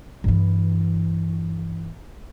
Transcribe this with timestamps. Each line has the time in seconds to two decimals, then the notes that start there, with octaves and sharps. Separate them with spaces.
0.24 G2 E3